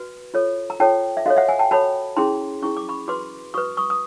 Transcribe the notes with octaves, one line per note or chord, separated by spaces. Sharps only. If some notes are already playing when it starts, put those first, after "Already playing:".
Already playing: F#4 B4
F4 A4 C#5
A#5
F4 A4 C#5 G5 A5
E5
F#4 A4 C#5 D#5 F5
E5 F#5
F#5 G#5
G5 A5
F#4 A4 C#5 A5 B5
C#4 E4 G#4 A#5 C6
C#4 E4 G#4 C#6
D6
B5 C#6
F#4 B4 C6 D6
F#4 B4 C#6 D#6
C#6 D#6
D#6